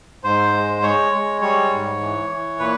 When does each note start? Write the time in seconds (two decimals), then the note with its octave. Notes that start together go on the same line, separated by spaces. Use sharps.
0.24 G#2 C5
0.53 G#3
0.83 G#3 C#5
1.12 G#3
1.41 G3 C#5
1.71 G#2
2.00 E3
2.30 E3
2.59 A#2 B4